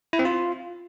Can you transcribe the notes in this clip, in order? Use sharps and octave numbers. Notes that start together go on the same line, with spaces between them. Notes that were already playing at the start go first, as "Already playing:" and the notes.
E4
C4
F4